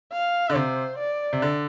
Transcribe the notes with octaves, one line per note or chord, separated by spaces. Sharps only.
F5
D3
C3 C5
D5
C3
D3